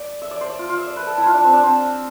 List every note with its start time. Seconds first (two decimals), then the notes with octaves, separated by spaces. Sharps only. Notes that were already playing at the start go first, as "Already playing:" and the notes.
Already playing: D5
0.22 E5
0.31 D5
0.41 C5
0.50 D5
0.59 F4
0.69 F4
0.78 E5
0.87 D5
0.96 B4
1.07 A4
1.18 E4
1.26 F4
1.34 D4
1.44 C4
1.53 D4
1.63 C4